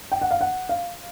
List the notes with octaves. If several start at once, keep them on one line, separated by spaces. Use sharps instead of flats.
G5
F#5
F5
F#5
F5